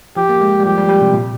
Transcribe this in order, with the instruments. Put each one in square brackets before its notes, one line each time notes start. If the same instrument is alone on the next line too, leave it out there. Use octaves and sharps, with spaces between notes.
[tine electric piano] F3 [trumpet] G4
[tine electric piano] A#3
G#3
G3
[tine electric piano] F3 [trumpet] G4
[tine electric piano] G3
G3
C3
A#2